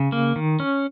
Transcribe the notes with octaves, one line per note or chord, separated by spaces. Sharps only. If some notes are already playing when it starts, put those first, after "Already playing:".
Already playing: C#3
A#3
D#3
C#4